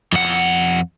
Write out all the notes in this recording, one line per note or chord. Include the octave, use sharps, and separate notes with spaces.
F2 F#5